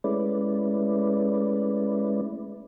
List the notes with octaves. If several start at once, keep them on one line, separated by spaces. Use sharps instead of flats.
G#3 A3 C#4 E4 B4 D5